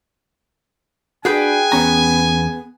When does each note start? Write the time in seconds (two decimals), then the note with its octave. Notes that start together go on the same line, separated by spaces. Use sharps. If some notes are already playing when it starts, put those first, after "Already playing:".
1.25 D4 F#4 G#4 B4 G5 G#5
1.72 E2 B3 C#4 A#5